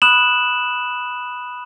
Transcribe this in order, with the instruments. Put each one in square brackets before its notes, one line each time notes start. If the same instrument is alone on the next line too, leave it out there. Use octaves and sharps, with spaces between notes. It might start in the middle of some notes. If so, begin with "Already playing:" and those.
[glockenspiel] B5 D#6 F#6 E7 F#7